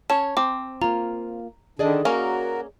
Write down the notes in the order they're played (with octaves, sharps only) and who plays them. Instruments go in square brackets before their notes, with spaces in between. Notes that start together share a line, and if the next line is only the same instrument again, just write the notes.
[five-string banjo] C#4 C#5 [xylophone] A5
[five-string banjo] C4 [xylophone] D6
[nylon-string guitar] A#3 F4 [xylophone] A#5
[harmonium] D3 D#3 D4 [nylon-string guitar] G#4 D5 D#5
[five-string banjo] A#3 C#4 [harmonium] F#4 A#4